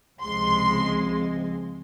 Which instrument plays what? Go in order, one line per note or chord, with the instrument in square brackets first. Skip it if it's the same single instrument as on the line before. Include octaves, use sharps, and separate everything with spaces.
[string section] C#2 C3 F3 G#3 C6